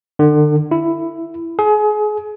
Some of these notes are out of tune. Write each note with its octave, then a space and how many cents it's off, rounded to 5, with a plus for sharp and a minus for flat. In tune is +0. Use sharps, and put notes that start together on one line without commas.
D3 +35
E4 +10
G#4 +30